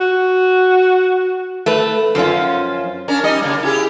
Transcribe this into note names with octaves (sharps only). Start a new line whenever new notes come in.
F#4
A3 B4
F#2 F3 C#4 F4
C#4 D4 A#4
G3 D#4 D#5
C#3 A#3
E4 G4 G#4